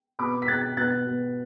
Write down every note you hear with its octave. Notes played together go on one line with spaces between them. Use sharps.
B2 B5 D6
B6
B2 F#6 A6
B2 F#6 A6
B2